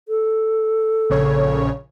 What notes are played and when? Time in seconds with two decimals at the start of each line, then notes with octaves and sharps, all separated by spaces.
0.08 A4
1.10 A#1 C#3 C#5